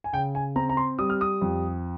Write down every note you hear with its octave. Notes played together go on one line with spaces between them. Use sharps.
G#5
C#3 G5
G#5
C4 A#5
A#5
C6
G3 D#6
F6
D#6
F2